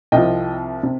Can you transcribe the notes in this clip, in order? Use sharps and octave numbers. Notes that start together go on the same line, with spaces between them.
C2 C3 F3 D#5 G5
C3